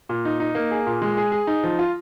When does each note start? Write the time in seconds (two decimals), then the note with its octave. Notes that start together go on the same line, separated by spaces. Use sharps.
0.09 A#2
0.25 D#4
0.40 D#4
0.55 A#3
0.71 G#4
0.87 A#2
1.02 G#3
1.17 G#4
1.32 G#4
1.47 D#4
1.64 F3
1.79 F4